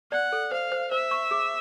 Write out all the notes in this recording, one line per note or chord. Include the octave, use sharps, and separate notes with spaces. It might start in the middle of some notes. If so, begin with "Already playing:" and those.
D5 F#5
A4
C5 F5
C5
C5 E5
C#6
G#4